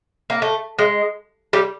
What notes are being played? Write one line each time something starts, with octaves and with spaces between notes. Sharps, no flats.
A#3
A3
G#3
G3